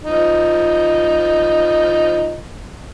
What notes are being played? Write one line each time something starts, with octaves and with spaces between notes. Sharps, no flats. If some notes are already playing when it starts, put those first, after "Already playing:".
F3 D#4